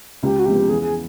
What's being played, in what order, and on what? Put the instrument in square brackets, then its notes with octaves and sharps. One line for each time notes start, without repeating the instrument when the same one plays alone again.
[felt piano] C#2 [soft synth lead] G4
[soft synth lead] F#4
[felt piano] C3 F3 G#3 B3 [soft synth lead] G4
[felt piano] E2 [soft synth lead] G#4
[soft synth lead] G#4